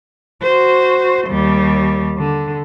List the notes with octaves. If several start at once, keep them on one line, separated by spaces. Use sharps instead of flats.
F#4 C5
D#2 G3
D3